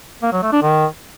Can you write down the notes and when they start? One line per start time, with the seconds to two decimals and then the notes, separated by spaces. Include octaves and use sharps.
0.23 A#3
0.33 F#3
0.42 A3
0.52 D4
0.62 D#3